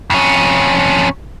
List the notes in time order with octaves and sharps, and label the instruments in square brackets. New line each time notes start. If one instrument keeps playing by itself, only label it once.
[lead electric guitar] F2 C#4